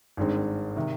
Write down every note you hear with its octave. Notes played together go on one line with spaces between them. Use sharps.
G#1 G2 D#3 G#3 C4
C3 D#3